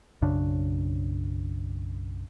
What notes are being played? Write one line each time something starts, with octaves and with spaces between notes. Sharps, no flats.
B1 F#2 C#3 D4